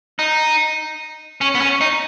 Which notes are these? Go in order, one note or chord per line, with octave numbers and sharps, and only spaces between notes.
D#4
C#4
B3
C#4
D#4